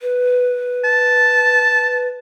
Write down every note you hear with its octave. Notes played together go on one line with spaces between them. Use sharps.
B4
A5